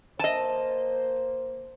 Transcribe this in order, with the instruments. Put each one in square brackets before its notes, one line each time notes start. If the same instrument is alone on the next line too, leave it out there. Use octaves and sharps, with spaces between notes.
[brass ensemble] A#3 C5 [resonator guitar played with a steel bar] D#5 A5